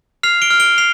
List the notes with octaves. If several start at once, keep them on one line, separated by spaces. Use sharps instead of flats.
F6 C7 F7
D7 G7
F6
D7 G7
C7 F7